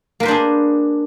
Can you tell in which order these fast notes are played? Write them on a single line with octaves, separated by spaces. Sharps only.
A#3 B4 C5 D4 G#4